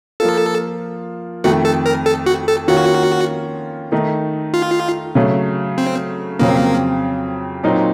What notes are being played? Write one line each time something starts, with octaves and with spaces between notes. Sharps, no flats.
F3 A#3 F4 A4
F2 D#3 A3 F#4
A4
A#4
A4
F#4
A4
D#3 A#3 C#4 F4 F#4
D#3 A3 D#4
F4
C#3 F#3 A3
C4
F2 C#3 F#3 A#3 C4
A#2 F#3 C4 D#4